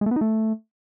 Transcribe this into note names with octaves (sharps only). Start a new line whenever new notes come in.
G#3
A3
B3
D#4
A3